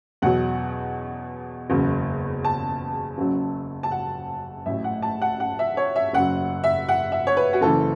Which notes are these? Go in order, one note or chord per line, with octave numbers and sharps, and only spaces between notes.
E2 B2 F#3 F#5
F#1 E2 C#3 F#3
A5
F#1 F#2 C#3 F#3
A5
F#5
A1 A2 F#3 E5
F#5
A5
F#5
F#5
E5
C#5
E5
F#1 F#2 F#3 F#5
E5
F#5
E5
C#5
B4
F#4
F#1 F#2 E3 A4